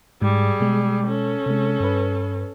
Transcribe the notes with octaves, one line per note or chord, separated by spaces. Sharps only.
G#2 G3 G#4
B2 G#3
C#4 A4
C3 G#3
G2 B4